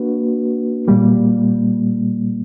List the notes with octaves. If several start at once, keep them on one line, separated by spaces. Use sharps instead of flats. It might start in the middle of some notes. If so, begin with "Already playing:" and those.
Already playing: A#3 D4 F#4 B4
A#2 G3 A#3